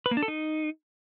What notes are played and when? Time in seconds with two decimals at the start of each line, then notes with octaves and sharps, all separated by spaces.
0.06 B4
0.11 A#3
0.17 D4
0.22 A4
0.28 D#4